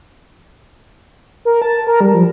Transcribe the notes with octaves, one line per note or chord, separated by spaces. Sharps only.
A#4
A5
A#4
G3
F3